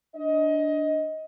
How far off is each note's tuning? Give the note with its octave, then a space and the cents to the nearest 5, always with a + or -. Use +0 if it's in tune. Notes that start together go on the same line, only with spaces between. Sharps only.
D4 +0 D#5 +20